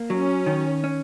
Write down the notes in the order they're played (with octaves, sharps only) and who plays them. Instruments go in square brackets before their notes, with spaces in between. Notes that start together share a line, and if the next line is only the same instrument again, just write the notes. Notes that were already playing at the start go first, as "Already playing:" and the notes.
Already playing: [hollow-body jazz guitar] A#3
[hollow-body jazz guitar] F#3 [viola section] C#4
[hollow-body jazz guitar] D#3
C#4